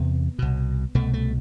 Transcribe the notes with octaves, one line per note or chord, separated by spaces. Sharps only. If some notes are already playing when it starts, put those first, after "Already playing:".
Already playing: E2 C3 B3
C2 B2
C2 B2 A3
A3